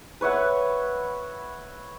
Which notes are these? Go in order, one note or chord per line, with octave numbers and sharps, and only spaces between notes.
B4 C#5 E5 F#5